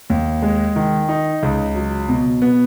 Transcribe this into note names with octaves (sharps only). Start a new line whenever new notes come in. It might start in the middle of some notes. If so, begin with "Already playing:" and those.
D#2
G#3
D#3
D#4
C#2
F#3
B2
B3